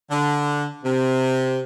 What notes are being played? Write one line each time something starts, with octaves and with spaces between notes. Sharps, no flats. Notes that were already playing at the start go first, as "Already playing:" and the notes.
D3
C3